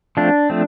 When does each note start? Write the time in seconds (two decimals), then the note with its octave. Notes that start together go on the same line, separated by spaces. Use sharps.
0.17 F3 A3 C4 D4
0.50 F3 A3 C4